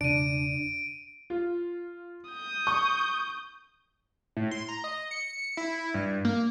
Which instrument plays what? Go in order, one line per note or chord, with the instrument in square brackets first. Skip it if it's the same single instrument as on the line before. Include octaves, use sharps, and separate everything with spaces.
[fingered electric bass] E1 C#3 [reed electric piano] D4 [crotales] D7 D#7
[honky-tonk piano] F4
[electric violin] D#6 G6
[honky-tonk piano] C#6
[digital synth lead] A2
C6
A#5
D#5
C#7
E4
G2
A#3